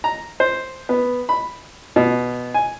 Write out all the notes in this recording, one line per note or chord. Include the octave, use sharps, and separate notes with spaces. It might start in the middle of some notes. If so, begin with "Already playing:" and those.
A#5
C5
B3
B5
B2
G#5